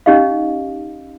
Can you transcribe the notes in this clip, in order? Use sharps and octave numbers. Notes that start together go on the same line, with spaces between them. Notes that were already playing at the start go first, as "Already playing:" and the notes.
C#4 D#4 G4 D#5 F5